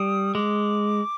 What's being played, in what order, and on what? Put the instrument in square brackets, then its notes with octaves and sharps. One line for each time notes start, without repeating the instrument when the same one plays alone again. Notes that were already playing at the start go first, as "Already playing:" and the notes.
Already playing: [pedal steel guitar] G3 [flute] D#6
[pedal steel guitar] G#3 [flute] D6